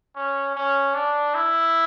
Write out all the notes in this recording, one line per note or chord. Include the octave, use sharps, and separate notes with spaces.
C#4
C#4
D4
E4